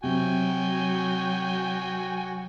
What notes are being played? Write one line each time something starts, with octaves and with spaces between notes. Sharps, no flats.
C3 F#3 F#4 G5 G#5